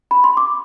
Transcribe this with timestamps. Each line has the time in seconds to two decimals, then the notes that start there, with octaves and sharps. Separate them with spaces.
0.11 B5
0.24 C6
0.37 D6